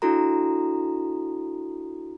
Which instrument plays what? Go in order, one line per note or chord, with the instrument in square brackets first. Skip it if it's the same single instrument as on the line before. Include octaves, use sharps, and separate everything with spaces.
[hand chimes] D4 E4 F#4 A4 A#5